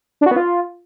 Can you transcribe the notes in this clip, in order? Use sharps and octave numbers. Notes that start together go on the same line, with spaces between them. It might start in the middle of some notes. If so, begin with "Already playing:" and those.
D4
F#4
B3
F4